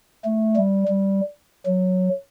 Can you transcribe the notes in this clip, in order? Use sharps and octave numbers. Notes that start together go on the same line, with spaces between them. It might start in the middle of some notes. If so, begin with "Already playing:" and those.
A3
G3
G3
F#3